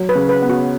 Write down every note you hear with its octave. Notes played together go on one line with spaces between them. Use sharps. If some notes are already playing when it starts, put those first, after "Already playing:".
Already playing: F#3
B4
C#3
B4
B3
F#4